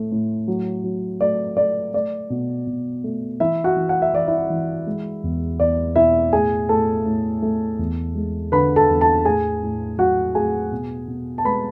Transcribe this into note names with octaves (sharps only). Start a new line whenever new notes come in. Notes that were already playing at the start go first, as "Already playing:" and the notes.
Already playing: A2 A3
A2
F#3
F#3
A3 D5
A3 D5
A3 D5
B2
B2
A3
E3 E4 E5
F#4 F#5
E3
F#5
E5
E3 D5
E4 E5
E3
G#3
E2
E2 D5
B2 E4 E5
A2 G#4 G#5
A2 A4 A5
A2
A3
E2
G#3
D3 B4 B5
A4 A5
E2
A4 A5
A2 G#4 G#5
A2
F#3 F#4 F#5
A2 G#4 G#5
B2
B2
A5
G#3 B4 B5